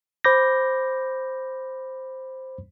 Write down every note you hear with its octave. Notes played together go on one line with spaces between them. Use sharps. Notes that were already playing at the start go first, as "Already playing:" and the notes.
C5 B5 D6 G6 A#6